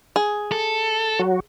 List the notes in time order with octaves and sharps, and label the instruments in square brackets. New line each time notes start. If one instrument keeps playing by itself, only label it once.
[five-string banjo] G#4
[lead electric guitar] A4
[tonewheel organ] F#3 F#4